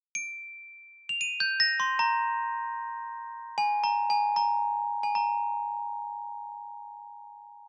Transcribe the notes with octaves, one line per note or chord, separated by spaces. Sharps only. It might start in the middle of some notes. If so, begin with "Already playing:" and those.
D7
F7
D#7
G6
A#6
C6
A#5
G#5
A#5
G#5
A#5
G#5
A#5